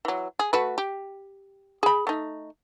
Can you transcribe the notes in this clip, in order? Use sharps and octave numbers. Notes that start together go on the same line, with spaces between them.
E3 F#3
G#4
A3 F#4 B4
G4
G#4 B5
A3 D#4